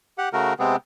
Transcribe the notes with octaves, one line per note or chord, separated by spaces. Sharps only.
G4 F#5
C#3 A3 F#4 A#4
C3 G#3 B3 C4